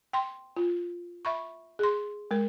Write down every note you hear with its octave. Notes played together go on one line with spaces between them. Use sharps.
G5 C6
F4
E5 B5 C#6
G#4 C6
G#3 A#4